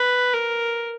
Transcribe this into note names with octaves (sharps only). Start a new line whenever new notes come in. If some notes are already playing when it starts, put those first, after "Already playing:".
Already playing: B4
A#4